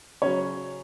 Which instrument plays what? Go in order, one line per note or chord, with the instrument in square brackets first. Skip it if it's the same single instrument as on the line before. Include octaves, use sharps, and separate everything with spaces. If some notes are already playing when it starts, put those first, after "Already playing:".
[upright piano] C#3 F#3 C#4 C#5